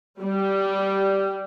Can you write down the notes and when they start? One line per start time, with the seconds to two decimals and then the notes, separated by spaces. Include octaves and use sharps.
0.20 G3